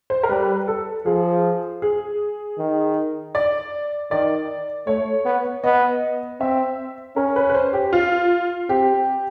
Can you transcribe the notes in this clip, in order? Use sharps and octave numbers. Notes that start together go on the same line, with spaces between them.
C5
A#4
G3 B4
A4
F3 G#4
G#4
D#3
D5
D#3 D5
A3 C#5
B3
B3 D#5
C4 E5
C#4 A#4
B4
B4
C5
G4
F4
C4 G4